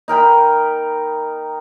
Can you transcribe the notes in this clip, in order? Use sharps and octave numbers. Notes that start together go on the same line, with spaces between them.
D#4 A#4 G5 B5